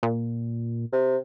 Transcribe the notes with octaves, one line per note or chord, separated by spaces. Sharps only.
A#2
C3